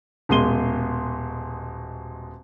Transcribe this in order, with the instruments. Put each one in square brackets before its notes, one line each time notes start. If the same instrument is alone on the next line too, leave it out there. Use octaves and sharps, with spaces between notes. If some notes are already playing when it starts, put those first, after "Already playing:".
[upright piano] D#1 B2 G#3 C6 D#7 G7